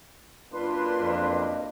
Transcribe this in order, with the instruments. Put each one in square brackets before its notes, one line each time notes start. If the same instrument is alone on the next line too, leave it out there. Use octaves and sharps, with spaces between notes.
[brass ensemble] F#2 A#3 D4 [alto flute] F4 [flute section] B4 C6
[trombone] F2
[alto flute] D#5